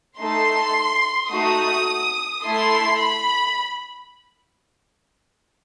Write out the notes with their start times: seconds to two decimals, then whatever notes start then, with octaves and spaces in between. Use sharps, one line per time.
0.19 A3 D#4 A4 C6
1.31 A3 D#4 F#4 D#6
2.43 A3 E4 A4 C6
3.00 B5